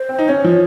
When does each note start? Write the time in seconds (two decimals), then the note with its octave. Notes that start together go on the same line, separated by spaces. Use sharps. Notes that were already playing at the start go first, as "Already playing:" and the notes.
Already playing: C5
0.09 C4
0.19 D#4
0.28 C#4 C#5
0.44 F3